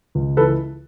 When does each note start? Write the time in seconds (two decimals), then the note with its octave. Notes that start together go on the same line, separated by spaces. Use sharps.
0.15 C#2
0.37 E3 A4 B4